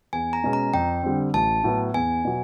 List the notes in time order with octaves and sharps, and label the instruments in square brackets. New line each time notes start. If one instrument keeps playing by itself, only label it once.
[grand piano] E2 [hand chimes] G#5
[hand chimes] A#5
[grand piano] B2 G#3 C#4
[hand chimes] A#5
[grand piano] F2 [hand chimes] G5
[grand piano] D3 G3 C4
[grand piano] A1 [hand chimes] A5
[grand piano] A2 F#3 B3
[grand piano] E2 [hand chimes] G#5
[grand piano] B2 F#3